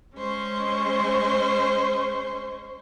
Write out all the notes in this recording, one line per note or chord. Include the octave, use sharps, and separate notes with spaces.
G#3 C#4 C5 C#6